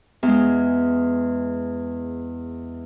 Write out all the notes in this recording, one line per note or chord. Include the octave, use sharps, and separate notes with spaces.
E2 G#3